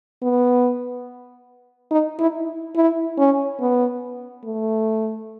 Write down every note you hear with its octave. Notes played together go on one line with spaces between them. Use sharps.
B3
D#4
E4
E4
C#4
B3
A3